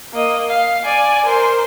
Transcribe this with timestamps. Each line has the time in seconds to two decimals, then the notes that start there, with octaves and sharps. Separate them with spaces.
0.13 A#3 D#5
0.49 F5
0.85 D5 G#5
1.26 A#4 C5